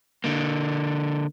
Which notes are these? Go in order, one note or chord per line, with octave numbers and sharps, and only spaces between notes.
D3 A#3